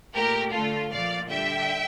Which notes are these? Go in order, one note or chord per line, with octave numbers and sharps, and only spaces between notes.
A#2 A3 G4 A#4
D3 A3 F4 A4
A#2 F3 A3 D5 F5
D3 G3 E5 G5